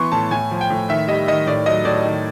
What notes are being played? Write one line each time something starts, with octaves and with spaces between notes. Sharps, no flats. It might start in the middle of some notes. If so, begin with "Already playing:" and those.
Already playing: E3 B3 C6 C#6
A2 A5
A2 G#5
F3
G5
A2
D#3 E5
G3 D#5
D#3 D#5
A2 D5
F#3 D#5
A2 D5
D#3